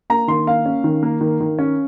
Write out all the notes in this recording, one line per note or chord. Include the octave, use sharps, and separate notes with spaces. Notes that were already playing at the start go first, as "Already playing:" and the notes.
A#3 A#5
D#3 C6
A#3 F5
C#4
D#3
A#3
D#3
D#3
C#4